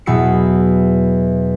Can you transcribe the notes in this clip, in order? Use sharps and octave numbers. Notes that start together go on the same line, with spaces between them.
E2 B2 F#3 E6 C7 C#7